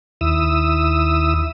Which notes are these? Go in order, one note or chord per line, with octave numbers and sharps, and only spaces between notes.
D#2 E4 D#6 E6